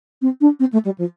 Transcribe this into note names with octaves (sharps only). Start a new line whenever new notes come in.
C4
D4
C4
A3
G3
F3